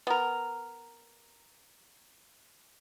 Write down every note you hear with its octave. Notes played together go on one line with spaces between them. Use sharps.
B3 A#4